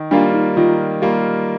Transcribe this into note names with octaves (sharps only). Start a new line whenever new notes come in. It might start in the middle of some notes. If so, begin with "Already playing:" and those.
Already playing: D#3
G3 A#3 D4 F4
D#4
D#3 F4
G3 A#3 F4 G4